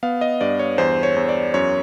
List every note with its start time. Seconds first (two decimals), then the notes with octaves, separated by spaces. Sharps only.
0.03 B3 F5
0.21 D#5
0.41 G2 D5
0.59 C#5
0.78 E2 C5
1.03 C#5
1.16 E2
1.29 D5
1.54 F#2 C#5